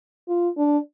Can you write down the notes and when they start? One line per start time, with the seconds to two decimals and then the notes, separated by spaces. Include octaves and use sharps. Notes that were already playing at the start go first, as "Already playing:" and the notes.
0.28 F4
0.57 D4